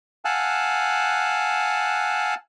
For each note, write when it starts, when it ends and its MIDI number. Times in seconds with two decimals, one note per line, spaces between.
0.25 2.35 77
0.25 2.35 78
0.25 2.35 80
0.25 2.35 81
0.25 2.35 88
0.25 2.35 90